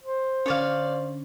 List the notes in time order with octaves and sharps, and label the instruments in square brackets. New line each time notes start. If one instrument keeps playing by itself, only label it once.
[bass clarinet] C5
[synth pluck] D3 C#4 [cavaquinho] C#5 D5 F5